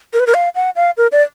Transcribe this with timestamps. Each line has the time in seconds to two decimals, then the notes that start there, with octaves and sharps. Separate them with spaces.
0.13 A#4
0.20 B4
0.27 A#4
0.34 F5
0.55 F#5
0.76 F5
0.97 A#4
1.12 D5